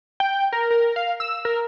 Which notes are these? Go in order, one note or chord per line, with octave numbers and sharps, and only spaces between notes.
G5
A#4
A#4
F5
E6
A#4